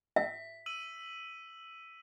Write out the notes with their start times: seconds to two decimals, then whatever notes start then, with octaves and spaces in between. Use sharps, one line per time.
0.16 E5 B6
0.66 E6 D#7 F#7